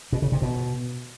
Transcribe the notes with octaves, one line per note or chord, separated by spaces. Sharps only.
B2
C#3
C3
B2